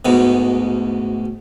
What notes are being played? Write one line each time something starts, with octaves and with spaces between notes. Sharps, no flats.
D2 G#2 B2